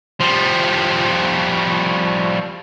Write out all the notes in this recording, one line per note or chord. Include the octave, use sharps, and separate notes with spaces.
F3 G3